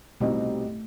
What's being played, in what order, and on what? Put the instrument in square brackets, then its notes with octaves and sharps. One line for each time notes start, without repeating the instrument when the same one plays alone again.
[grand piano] C2 B2 G3 C4 D#4 [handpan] A3